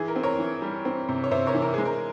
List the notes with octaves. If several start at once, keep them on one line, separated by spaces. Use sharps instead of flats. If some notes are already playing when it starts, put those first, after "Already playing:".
Already playing: E3 G#4
A#4
C4
A#4 C#5
E3
G3
C4
C3
C#5
C3 C5 E5
A#4 C#5
E3
A#4
G#3 G#4
A#4